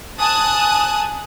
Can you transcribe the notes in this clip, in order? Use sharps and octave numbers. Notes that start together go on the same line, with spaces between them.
G#5 A5 D#6 F#6